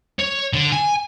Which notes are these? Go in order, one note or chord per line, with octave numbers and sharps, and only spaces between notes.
C#5
D3
G#5